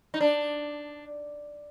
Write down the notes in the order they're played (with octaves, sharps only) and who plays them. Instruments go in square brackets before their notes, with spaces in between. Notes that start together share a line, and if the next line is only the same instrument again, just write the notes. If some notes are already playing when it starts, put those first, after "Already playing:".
[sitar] D#4
D4